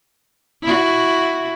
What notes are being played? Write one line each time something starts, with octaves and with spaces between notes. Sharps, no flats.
E4 F#4